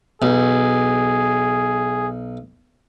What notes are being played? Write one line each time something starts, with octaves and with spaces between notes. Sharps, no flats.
B1 G#4